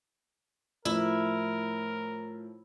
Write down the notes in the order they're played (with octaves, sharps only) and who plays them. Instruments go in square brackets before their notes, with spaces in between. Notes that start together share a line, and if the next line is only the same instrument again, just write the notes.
[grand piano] A2 F3 [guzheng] E4 [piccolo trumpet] A#4